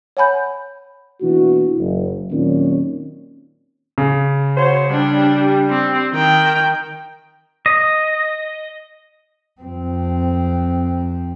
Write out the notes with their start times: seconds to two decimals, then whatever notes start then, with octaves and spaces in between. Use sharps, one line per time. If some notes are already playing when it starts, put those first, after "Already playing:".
0.17 C#5 F#5 G#5 B5 G6
1.21 B2 E3 A#3 D4 E4 F#4
1.78 F#1
2.31 D#2 A#2 D#3 F#3 C4 C#4
3.98 C#3
4.57 F#4 C5 C#5
4.90 G3 D4
5.70 C4
6.13 D#3 G5
7.66 D#5
9.61 F2 C4